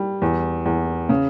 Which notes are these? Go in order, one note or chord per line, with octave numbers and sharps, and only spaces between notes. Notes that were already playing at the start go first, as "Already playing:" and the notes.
Already playing: G3
E2
E2
C#3